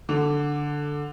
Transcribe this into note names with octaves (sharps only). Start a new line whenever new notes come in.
D3